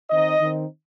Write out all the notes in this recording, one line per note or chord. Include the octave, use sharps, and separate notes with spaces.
D#3 C4 D#4 D#5
D#3 C4 D#4